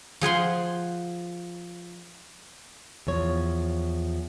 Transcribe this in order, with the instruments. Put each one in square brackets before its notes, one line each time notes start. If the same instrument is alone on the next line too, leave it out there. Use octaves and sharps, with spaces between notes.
[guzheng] F3 G#4 F#5 C6
[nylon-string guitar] E2 F3 C#5